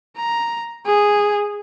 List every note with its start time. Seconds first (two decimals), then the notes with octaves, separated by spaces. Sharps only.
0.17 A#5
0.85 G#4